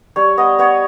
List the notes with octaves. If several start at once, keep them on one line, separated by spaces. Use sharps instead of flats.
G3 C#5
B3 D#5
B3 C#5